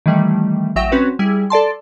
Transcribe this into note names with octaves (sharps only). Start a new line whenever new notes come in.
D#3 E3 G3 A3
A1 F#3 E5 G5 A#6
C4 C#4 F#4 B4
G3 E4 G#4
A4 D5 A5 C6